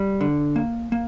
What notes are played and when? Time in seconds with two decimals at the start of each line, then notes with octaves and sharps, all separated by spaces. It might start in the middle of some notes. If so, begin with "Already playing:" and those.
Already playing: G3
0.21 D3
0.56 A#3
0.92 A#3